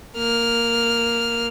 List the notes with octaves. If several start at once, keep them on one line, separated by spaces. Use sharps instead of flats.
A#3 F6